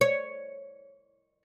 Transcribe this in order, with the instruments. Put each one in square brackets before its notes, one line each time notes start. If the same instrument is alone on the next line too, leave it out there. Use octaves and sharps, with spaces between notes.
[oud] C#5